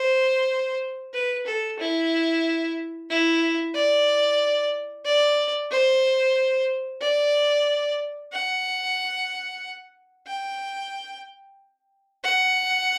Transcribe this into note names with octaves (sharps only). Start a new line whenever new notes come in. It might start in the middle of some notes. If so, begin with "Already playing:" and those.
Already playing: C5
B4
A4
E4
E4
D5
D5
C5
D5
F#5
G5
F#5